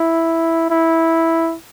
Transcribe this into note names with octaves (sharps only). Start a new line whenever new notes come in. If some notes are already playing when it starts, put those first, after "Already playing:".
Already playing: E4
E4